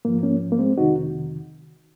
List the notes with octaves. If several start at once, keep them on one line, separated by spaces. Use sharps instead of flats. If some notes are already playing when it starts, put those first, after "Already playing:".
G#2 F3 A#3
A#3 C#4
A#3
G#3 C4
F2 C3 D#3 D#4 F#4